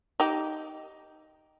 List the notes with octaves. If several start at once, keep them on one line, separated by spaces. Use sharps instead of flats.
D#4 G4